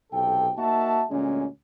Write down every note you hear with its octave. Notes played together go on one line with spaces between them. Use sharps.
B1 C3 A4 G5
A#3 D#4 F#4 E5 A5
D2 A#2 G#3 C#4